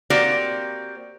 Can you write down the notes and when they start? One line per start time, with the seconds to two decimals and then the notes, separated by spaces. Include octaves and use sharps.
0.10 A#3 C4 F#4 G4 D5